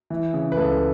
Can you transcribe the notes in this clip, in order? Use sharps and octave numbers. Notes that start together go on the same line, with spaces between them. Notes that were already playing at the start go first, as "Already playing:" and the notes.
E3
C#3
B4
C#2 A4